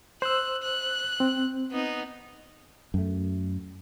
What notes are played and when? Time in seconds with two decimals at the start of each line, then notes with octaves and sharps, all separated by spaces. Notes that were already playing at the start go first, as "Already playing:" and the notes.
0.22 C5 E6 F#6
0.63 F#6
1.20 C4
1.71 B3 D#4
2.94 F#2 A3